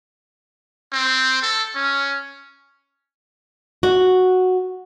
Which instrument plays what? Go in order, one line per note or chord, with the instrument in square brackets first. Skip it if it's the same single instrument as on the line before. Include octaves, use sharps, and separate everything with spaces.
[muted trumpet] C4
A4
C#4
[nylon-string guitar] F#4